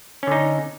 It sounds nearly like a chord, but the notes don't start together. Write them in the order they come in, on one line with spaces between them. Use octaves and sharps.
C#4 D3 D#4